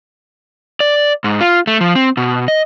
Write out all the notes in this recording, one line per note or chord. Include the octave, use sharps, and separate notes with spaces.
D5
G#2
F4
A3
F3
C4
B2
D#5